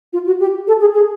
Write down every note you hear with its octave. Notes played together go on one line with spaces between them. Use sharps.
F4
F#4
G4
A4
G#4
G#4